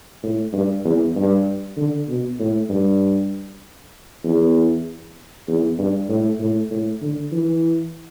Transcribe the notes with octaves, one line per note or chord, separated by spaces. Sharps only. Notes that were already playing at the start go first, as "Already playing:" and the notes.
A2
G2
E2
G2
D3
B2
A2
G2
E2
E2
G2
A2
A2
A2
D3
E3